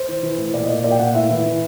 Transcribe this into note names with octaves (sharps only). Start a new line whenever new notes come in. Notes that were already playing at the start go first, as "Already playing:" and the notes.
Already playing: C5
E3
E3
A2
A#2 D5
D#5
A#2 D5
A#2 D5
G5
A#2 F#5
A2 E5
E3
E3